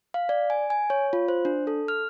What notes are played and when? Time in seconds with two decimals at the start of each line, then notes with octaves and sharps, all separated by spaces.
0.14 F5
0.29 D5
0.50 G#5
0.70 G#5
0.90 C#5
1.13 F4
1.28 C5
1.45 D4
1.67 A4
1.88 F6